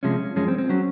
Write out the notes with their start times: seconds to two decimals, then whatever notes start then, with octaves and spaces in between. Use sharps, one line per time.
0.03 C3 F3 G#3 C#4
0.36 F#2 F3 G#3 C#4
0.48 C4
0.58 C4
0.69 F#3 C#4